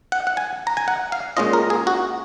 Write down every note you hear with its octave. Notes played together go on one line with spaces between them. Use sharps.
F#5
F#5
G#5
A#5
G#5
F#5
F5
A#2 G#3 C#4 F4 D#5
A#4
G#4
F#4